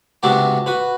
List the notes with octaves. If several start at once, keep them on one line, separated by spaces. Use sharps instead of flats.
C#2 C3 B3 D4 F#4 D6
F#4 B4